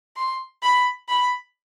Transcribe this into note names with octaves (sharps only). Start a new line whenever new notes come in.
C6
B5
B5